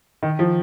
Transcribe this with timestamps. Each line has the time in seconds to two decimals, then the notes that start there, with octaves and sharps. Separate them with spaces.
0.23 D#3
0.39 F3